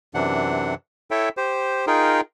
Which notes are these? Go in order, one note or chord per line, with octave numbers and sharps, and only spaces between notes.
F#2 C3 E3 D4 F#5
E4 A4 C#5 E5 G5
G4 C5
D#4 F4 G#4 A#4 G5